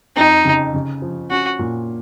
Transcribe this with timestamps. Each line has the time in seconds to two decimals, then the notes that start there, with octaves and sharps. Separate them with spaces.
0.16 F2 D#4
0.45 C#3
0.74 C#3
1.02 F3
1.31 C#4 F#4
1.59 A#2